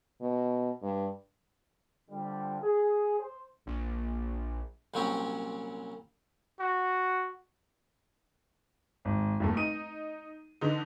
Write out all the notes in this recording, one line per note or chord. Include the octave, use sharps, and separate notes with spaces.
B2
G2
D3 F3 G3
G#4
C5
A#1
C2 A#2 F#3 G3 C4 C#4
F#4
G#1
F1 G2 A#2 A3
D#4 D#7
D3 E3 D#4